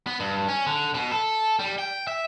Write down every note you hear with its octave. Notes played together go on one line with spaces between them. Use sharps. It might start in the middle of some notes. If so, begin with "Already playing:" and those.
B3
G2
C#4
D3
B2
A4
G3
G5
E5